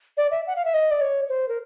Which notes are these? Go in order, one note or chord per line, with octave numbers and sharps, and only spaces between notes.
D5
E5
F#5
F5
E5
D#5
D5
C#5
C5
A#4